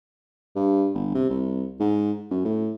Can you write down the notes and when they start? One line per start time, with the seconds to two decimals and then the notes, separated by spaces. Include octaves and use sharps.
0.56 G2
0.94 G1
1.15 C3
1.30 C2
1.80 G#2
2.31 F#2
2.45 A2